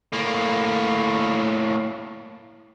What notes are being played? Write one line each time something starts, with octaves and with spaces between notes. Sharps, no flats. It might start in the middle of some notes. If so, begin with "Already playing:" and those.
A2 A#3